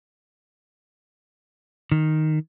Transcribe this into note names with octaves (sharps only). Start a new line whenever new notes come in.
D#3